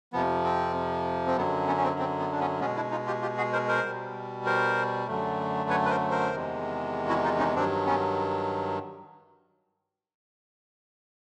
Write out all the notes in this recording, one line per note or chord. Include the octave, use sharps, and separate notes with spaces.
F2 C3 F3 B3
C4
C4
F#2 D3 F#3 B3
B3 C#4
C#4
C4
C4
B3
D4
B3 C#4
B2 G#3 B3 C#4
D4 E4
D#4 F4
F4 G4
F4 G4
F#4 G#4
A#4 C5
A#4 C5
B2 G3
A#4 C5
F#2 D3 F#3 A3
B4 C#5
B4
A#4 C5
A#4 C5
E2 C3 D#3 G#3
E4 F#4
D#4 F4
C#4 D#4
G2 D#3 F#3 C4 D4
B3 C#4